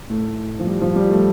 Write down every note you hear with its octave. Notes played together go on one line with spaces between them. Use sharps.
A2 A3
F3
G3
F3
G3
A3